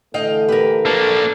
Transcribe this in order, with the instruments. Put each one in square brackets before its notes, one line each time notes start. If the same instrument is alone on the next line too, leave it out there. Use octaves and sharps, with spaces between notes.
[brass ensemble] D3 E3 A3 [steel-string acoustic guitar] D#5 F5 G5
[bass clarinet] G4 [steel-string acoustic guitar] A#4 B4
[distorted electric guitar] A#3 D4 [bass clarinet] A4